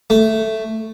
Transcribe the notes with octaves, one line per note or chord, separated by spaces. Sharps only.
A3